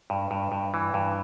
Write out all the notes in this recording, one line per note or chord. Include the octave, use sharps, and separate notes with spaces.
G2
G2
G2
E3
G2